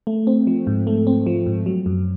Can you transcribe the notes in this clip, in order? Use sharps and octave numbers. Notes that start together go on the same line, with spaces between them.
A3
C4
F3
G#2
A3
C4
F3
G#2
F#3
F#2